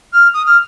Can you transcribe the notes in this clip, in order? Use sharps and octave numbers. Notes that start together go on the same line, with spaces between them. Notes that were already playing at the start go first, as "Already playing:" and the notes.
F6
D#6
F6